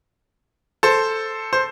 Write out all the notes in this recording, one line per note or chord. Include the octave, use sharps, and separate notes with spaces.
A4 C5
C5